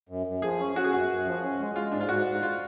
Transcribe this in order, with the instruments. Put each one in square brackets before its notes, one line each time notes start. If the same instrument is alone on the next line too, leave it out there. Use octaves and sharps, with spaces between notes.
[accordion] F#2
F#2
[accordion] F3 [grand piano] G#4
[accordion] C#4
[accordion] C#4 [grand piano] F#4
[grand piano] G#4
[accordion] F#2 [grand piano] F#4
[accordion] F#2
F3
C#4
G#3
[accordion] G#3 [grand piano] F4
[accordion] G#2 [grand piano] D4
[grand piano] F4
[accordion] G#2 [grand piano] F#4
[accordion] G#2
[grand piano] F4